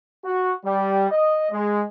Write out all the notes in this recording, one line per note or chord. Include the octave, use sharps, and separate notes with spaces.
F#4
G3
D#5
G#3